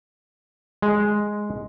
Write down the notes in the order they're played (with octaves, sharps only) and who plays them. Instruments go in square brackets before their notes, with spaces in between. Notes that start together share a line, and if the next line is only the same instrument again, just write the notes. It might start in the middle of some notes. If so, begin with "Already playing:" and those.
[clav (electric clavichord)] G#3